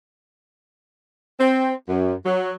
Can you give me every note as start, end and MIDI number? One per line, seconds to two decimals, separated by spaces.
1.39 1.73 60
1.88 2.14 42
2.26 2.53 54